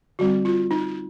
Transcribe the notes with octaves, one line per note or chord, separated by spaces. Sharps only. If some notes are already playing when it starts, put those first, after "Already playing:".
D3 G3 C4 F#4
F4
D#4